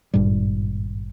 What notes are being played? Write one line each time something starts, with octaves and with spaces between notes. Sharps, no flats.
G#1 G2 A#2 G3